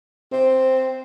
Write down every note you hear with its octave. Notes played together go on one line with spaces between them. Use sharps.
C4